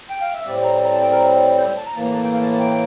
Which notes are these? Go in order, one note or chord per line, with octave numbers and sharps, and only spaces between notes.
G5
F5
E5
A2 G3 C4 D5
A#5
A#5
A5
G5
A#4
C5
A5
A#5
A2 E3 A#3 A5
A#5
A5
G5
F5
A5
A5
G5